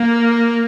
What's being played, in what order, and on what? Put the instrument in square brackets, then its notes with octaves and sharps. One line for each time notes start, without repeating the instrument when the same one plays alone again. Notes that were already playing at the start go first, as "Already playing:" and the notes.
Already playing: [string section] A#3